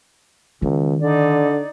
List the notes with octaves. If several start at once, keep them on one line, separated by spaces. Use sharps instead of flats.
C#2 D#3
D3 D#4 D5